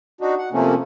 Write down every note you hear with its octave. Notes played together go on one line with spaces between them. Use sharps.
D4 D#4 F#4
F#5
C3 F3 A3 A#3 C4 C#4